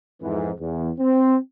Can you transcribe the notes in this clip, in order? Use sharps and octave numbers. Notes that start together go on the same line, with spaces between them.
F2 G#2 E3
E2
C4